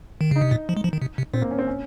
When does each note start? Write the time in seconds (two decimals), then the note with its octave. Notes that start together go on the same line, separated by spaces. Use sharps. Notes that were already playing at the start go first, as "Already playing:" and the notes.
0.21 D#3
0.31 C#3 D#4
0.41 C3
0.51 A#2
0.69 F3
0.77 G#3
0.84 F3
0.93 D#3
1.02 C3
1.18 C3
1.33 A#2 C4
1.42 A#3
1.51 C#4
1.59 C4
1.67 C#4